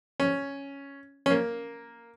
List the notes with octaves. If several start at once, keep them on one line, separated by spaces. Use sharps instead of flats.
C#4
C#4
A#3